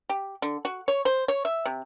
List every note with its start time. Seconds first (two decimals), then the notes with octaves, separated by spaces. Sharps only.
0.09 G4
0.42 D3
0.65 F#4
0.88 C#5
1.05 C5
1.28 C#5
1.45 E5
1.65 C3